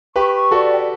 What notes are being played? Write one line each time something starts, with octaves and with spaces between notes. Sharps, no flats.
G4 B4 C#6
C#6
F#4 A4 D5
G5